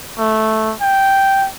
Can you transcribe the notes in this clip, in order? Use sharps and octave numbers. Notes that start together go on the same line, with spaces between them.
A3
G5